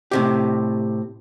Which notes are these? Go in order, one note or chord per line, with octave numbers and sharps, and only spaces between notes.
A2 C3 G4